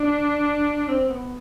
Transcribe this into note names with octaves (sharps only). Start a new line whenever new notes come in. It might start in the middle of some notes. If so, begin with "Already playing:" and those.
Already playing: D4
C4
B3